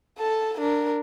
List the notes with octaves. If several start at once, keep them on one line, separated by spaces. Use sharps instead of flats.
A4 A5
D4 A#4